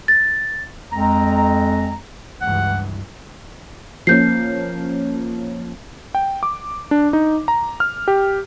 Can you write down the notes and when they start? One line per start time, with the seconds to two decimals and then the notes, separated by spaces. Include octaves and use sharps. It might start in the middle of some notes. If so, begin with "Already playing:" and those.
0.08 A6
0.92 F2 G#3 C4 A#5
2.42 C#2 G2 E3 F#5
4.07 F3 A#3 C#4 G6 C7
6.15 G5
6.43 D6
6.91 D4
7.13 D#4
7.48 A#5
7.80 F6
8.08 G4